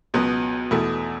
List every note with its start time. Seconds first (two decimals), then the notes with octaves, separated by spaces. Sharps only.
0.14 C#2 B2 F#3 B3
0.71 E2 B2 A3 E4